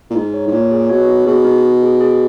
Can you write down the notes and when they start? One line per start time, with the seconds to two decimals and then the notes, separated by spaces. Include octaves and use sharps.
0.10 A#2
0.16 G#2 D#4
0.34 C#5
0.48 G#2
0.52 A#2 C#5
0.71 G#4
0.89 B2 C#5
1.09 D#4
1.26 B2 G#4
1.45 D#4
1.64 D#4
1.83 G#4
2.01 G#4